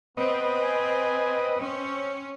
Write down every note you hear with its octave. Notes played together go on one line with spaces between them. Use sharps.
B3 C4 B4 D#5
G#5
C4 C#4